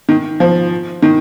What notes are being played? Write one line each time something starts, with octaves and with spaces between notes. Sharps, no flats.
D#3
F3
D#3